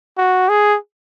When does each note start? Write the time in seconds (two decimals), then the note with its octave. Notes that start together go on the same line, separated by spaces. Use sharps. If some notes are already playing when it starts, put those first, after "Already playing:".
0.18 F#4
0.49 G#4